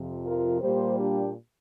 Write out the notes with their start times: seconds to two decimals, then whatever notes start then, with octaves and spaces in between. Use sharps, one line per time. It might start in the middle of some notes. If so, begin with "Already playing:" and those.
Already playing: F2 C3 F3
0.25 F4 A#4
0.61 A#2 G3 A#3 G4 C5
0.98 D4 G4